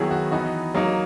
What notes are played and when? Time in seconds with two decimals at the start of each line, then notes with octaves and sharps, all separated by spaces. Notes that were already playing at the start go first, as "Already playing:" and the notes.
Already playing: D#3 F#3 B3 E4 G#4
0.11 F#4
0.31 E3 B3 D#4 F#4
0.75 F#3 A#3 D#4